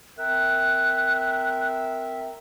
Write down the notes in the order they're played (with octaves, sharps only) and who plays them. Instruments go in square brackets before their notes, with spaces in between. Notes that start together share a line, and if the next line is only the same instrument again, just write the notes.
[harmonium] C4 A#4 E5 [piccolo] F#6